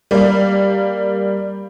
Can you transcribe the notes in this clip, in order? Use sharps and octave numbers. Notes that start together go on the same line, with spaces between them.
G3 A#3